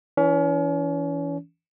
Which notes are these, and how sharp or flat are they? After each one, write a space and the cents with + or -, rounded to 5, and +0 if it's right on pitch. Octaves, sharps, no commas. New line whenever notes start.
E3 +0 C#4 +35